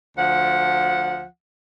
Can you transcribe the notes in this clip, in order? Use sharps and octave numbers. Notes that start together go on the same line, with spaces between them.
D2 F3 F#5